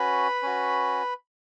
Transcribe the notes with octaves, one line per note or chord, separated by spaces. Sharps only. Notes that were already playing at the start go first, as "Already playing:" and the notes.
Already playing: C#4 F#4 B4 B5
C#4 F#4